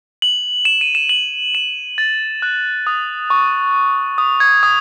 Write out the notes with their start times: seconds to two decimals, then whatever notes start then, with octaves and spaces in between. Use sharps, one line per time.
0.22 F#7
0.65 E7
0.81 D#7
0.95 E7
1.09 F#7
1.55 E7
1.98 A6
2.42 F#6
2.87 D#6
3.30 C#6
4.18 D#6
4.40 G#6
4.63 D#6